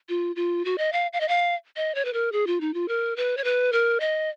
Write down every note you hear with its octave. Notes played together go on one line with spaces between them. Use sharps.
F4
F4
F#4
D#5
F5
F5
D#5
F5
D#5
C#5
B4
A#4
G#4
F4
D#4
F4
A#4
B4
C#5
B4
A#4
D#5